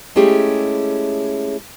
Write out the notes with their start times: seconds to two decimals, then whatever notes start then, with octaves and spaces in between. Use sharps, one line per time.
0.16 G#3 A3 C#4 E4 G4 G#4